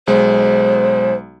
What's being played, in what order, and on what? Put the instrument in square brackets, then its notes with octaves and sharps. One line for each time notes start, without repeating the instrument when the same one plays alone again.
[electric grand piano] B1 G#3 [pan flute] C5